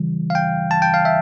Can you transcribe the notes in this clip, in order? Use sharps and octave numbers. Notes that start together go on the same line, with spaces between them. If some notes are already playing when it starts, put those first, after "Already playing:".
Already playing: C#3 E3 G3
F5
G5
A5
G5
F5
E5